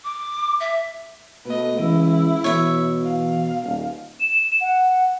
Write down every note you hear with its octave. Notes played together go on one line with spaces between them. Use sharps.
D6
E5
B2 A3 B4 D#5
C#2 E3 E4
B2 E3 C#5 E5
F5
D#1
E7
F#5